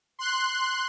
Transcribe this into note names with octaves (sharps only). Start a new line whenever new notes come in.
C6 F#6